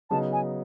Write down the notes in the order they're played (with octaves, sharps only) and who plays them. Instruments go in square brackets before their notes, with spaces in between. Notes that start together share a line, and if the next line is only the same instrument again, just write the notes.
[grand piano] C#3 F#3 B3 D#4 [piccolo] A5
[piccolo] G#5